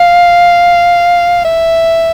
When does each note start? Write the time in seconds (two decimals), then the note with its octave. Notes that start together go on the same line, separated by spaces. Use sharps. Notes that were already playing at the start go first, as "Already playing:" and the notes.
Already playing: F5
1.45 E5